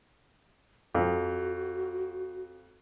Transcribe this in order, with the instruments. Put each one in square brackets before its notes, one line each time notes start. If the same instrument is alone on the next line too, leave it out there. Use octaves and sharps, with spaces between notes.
[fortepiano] F2 [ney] F#4